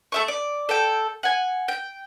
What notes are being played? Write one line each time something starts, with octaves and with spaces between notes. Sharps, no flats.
A3 E5 C#6
D5
A4 G5
F#5 G#5
G5